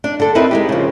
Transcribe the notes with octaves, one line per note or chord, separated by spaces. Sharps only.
D4
D3 A4
C4 D#4 E4 A#4 B4
G#3 D#4 G4
C#3 F3